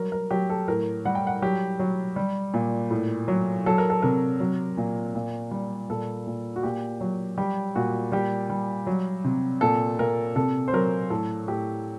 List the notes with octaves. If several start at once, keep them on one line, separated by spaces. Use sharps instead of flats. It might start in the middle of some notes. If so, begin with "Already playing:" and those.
Already playing: F#3 G3 A#4
A#4
F#3 G4
A4
A2 A#4
G3 F#5
G5
F#5
F#3 G4
F#3
G3
A#2
A2
F#3
F#3 A4
A#4
A4
C3 A#4
F#3
A#2
A#2
G3
A#2 A4
A#2
F#4
A#2 G4
F#3
G3 G4
A#2 F#4
G3 G4
G3
F#3
C3
A#2 A4
A#2 A#4
C3 A4
C5
F#3 A#4
A2 A4
A2 G4